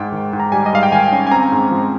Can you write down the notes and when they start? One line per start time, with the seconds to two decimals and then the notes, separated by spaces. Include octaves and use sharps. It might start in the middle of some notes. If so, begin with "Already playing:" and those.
Already playing: G#2 G#3 G5
0.12 D#3
0.33 G#2
0.40 A#5
0.52 G3 G#5
0.66 D#5
0.73 G#2 F5
0.83 G5
0.92 D#3 G#5
1.12 C#4
1.27 G#5
1.31 C4 A#5
1.52 G#2
1.71 F3